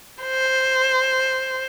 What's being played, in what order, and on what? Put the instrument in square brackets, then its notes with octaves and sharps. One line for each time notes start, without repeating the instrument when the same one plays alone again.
[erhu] C5